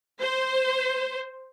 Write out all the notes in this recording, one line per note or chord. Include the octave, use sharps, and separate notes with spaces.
C5